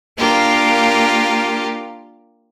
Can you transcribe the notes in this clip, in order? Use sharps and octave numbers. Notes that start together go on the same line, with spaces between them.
A#3 D4 F4 G4 A#4